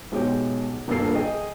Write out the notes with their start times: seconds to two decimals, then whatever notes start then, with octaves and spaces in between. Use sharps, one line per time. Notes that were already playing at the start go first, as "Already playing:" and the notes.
0.12 B1 G#3 G4 C#5 G5
0.88 D#1 G2 A#3 A4 C7
1.15 G#4 D#5 G5